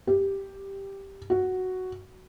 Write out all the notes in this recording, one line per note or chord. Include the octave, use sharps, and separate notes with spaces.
G4
F#4